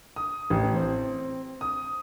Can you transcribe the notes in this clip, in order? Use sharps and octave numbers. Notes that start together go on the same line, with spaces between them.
D#6
A1
C4
D#6